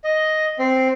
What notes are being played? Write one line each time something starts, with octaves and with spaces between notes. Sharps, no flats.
D#5
C4